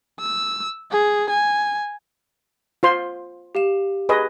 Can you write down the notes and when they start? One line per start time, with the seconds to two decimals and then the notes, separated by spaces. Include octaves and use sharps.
0.20 E6
0.92 G#4
1.30 G#5
2.83 F4 C5 C6
3.55 G4 F5 E7
4.09 G#4 B4 D#5